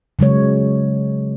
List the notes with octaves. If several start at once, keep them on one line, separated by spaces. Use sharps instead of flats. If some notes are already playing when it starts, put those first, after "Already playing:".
C#3 F#3 G#3 C#5